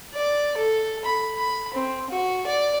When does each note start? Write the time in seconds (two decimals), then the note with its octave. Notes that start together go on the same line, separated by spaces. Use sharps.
0.14 D5
0.57 A4
1.05 B5
1.38 B5
1.74 C4
2.10 F#4
2.46 D5